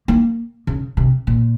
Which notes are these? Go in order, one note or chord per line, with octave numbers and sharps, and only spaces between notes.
A#3
C#3
C3
A#2